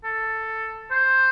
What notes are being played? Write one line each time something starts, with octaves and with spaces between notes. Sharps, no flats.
A4
C5